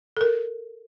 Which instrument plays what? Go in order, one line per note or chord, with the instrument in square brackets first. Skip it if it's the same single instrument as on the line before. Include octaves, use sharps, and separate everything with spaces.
[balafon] A4 A#4